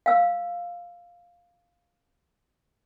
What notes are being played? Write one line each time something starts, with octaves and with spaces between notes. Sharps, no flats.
F5 E6